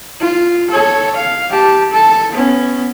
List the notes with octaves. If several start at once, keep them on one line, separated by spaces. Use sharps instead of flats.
F4
A4 C#5
F5
G4 A5
A4 A5
B3 C#4